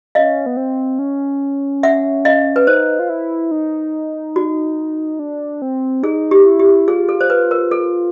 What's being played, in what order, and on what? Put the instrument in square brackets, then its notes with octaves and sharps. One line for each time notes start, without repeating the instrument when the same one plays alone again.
[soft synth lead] C#4 [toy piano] D#5 F5
[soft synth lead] B3
C4
C#4
[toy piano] E5 F#5
D#5 F5
B4
[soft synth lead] D#4 [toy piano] C5
[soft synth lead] F4
E4
D#4
[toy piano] F#4
[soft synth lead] D4
C4
[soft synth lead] D#4 [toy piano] G#4
[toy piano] G4
[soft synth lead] E4
[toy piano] G4
[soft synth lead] F4 [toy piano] G#4
[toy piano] A4
C5
B4
A#4
A4